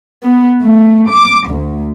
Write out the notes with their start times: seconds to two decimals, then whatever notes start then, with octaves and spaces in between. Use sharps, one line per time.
0.25 B3
0.62 A3
1.09 D6
1.50 D2